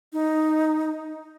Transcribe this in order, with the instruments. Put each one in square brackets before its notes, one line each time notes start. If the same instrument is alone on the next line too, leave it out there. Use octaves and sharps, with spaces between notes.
[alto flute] D#4